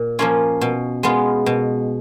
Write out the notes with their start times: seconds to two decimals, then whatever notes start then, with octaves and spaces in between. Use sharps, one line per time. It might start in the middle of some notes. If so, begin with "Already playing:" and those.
Already playing: A#2
0.19 F3 A#3 C#4 F4
0.61 B2
1.03 G#3 B3 F4
1.46 B2